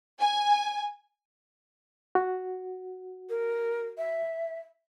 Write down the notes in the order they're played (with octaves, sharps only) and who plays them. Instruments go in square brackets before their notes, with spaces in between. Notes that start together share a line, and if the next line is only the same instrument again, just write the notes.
[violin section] G#5
[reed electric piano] F#4
[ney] A#4
E5